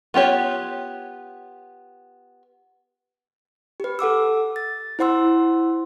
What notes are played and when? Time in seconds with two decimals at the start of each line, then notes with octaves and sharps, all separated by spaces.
0.14 B3 F4 G4 C#5
3.80 G4 B4
3.99 A4 F#5 D6 E6
4.56 A6
4.99 E4 C5 F#5 C6 E6